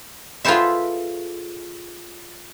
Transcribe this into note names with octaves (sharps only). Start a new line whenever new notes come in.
F4 G#4 A4 B4 C5 E5